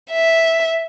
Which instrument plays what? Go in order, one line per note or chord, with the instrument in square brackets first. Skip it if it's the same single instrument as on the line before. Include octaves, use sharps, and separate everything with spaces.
[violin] E5